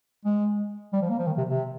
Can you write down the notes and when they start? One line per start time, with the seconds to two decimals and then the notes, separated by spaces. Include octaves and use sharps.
0.25 G#3
0.93 G3
1.02 F3
1.10 A#3
1.19 F3
1.27 D#3
1.38 C3
1.50 C3